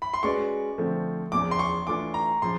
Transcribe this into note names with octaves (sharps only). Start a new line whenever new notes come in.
B5
C6
G#3 C#4 F#4 B4 D5 C#6
D3 F3 A3 C4
E2 C#3 F3 D6
C6
C#6
E3 A3 D4 F4 D6
A#5
C#3 F3 C6